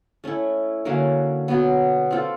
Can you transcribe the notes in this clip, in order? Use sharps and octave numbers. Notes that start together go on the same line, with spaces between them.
A3 C#4 E4
D3 F#3 A#3 C#4
B2 F#3 B3
C4 F4 A4